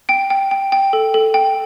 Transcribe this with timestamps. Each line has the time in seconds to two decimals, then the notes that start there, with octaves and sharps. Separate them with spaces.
0.09 G5 D7
0.30 G5
0.51 G5
0.72 G5
0.93 A4
1.14 A4
1.34 G5